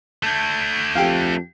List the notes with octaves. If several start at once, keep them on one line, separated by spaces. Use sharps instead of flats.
A3 D4 G6 G#6
F2 G4 F5